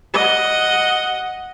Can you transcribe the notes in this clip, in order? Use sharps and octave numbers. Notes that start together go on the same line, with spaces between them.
D#5 F#5